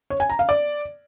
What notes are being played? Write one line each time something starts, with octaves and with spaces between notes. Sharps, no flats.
C#5
G#5
A#5
F5
D5